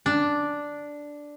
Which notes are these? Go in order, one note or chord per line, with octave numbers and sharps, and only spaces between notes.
D4